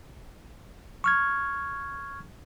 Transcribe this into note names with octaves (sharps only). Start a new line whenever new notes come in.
C#6 F6 G#6